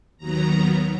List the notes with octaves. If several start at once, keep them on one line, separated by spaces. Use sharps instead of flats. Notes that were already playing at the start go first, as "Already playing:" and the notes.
D#2 D#3 F#3 B3 A#5